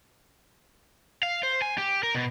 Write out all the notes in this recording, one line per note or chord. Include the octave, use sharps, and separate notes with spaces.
F5
C5
G#5
G4
A#4
B2